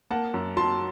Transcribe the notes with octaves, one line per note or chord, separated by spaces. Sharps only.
A#3 F#5 A5
F#2
F#3 A5 C6